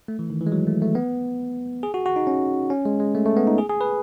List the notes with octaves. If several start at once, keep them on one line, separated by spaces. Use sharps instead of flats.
A3
E3
D#3
E3
G#3
F#3
A3
A3
B3
G#4
F#4
F#4
D#4
C#4
C#4
G#3
G#3
A3
A3
B3
D#4
G#4
G#4
B4